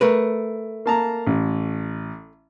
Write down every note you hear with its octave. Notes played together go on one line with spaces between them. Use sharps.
A3 A#4 B4
A#3 A5 A#5
A1